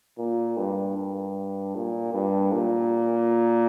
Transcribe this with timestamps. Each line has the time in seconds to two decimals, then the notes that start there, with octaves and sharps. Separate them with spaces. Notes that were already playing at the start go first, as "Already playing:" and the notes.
0.18 A#2
0.57 G2
0.97 G2
1.75 A#2
2.14 G2
2.53 A#2